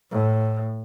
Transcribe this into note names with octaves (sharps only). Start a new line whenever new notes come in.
A2